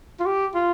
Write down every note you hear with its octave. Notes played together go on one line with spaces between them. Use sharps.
F4
G4
F4